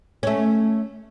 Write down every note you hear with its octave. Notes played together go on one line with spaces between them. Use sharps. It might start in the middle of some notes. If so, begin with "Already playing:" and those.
A3 C#4